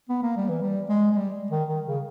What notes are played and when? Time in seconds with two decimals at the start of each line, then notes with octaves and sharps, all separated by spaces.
0.09 B3
0.23 A#3
0.37 G3
0.49 E3
0.62 G3
0.89 G#3
1.11 G#3
1.16 G3
1.51 D#3
1.68 D#3
1.87 C#3